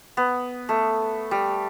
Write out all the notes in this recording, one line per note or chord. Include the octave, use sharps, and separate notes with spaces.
B3
A3
G3